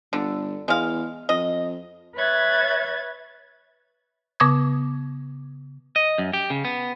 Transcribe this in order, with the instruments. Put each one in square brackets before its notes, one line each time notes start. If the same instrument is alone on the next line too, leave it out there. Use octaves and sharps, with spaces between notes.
[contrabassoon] G1 [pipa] D3
[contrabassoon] E2 [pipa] G#3 F5
[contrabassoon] F2 [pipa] D#5
[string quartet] B4 C#5 E5 F#6 G#6 A6
[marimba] C#3 B3 D6 D#6 G#6
[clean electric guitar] D#5
F#2
G4
C#3
B3